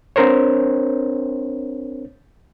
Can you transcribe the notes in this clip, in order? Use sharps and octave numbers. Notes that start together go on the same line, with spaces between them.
C4 D4 A#4 C5 C#5